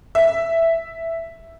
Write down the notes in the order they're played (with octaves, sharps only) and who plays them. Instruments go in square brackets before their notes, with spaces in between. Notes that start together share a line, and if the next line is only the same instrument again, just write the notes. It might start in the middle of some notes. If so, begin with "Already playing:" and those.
[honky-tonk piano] E5